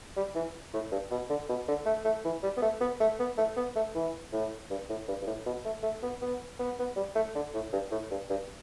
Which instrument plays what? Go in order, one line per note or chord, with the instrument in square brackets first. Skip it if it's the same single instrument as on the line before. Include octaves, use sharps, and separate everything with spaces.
[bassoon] G3
E3
A2
G2
B2
D3
B2
D3
A3
A3
E3
G3
B3
A3
B3
A3
B3
A3
B3
A3
E3
A2
G2
A2
G2
G2
A2
B2
A3
A3
B3
B3
B3
B3
G3
A3
D3
A2
G2
A2
G2
G2